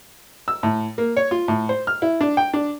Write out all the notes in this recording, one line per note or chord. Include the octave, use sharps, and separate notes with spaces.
E6
A2
A#3
C#5
F4
A2
C5
F6
E4
D4
G5
D4